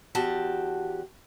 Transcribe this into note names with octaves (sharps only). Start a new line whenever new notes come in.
E2 F#4 G4 A5